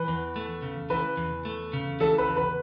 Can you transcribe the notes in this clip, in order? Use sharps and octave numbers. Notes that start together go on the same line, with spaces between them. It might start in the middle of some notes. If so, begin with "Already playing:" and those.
Already playing: E3 B4
E2
A3
C#3
E3 B4
E2
A3
C#3
E3 A4
B4
E2
B4